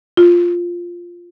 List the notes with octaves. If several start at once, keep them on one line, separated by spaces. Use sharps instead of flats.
F4